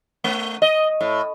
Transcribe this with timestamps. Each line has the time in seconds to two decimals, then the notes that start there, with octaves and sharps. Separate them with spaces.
0.24 A3
0.62 D#5
1.01 A2